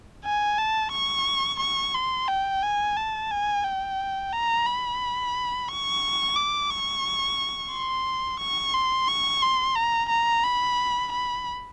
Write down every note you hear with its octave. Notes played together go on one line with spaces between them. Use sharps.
G#5
A5
C#6
C#6
C6
G5
G#5
A5
G#5
G5
A#5
B5
C#6
D6
C#6
C6
C#6
C6
C#6
C6
A#5
A#5
B5
B5